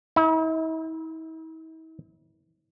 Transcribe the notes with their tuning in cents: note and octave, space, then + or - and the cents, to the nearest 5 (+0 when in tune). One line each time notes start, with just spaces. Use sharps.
E4 -45